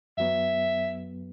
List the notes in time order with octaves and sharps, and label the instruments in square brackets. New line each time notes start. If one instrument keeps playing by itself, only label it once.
[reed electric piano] F#2 F#3 B3 [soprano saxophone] E5